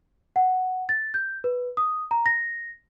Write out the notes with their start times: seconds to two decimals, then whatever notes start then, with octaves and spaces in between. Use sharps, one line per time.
0.36 F#5
0.89 A6
1.14 G6
1.44 B4
1.77 D#6
2.11 A#5
2.26 A#6